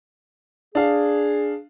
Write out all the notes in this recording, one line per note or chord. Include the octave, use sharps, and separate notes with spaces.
D4 G#4 F5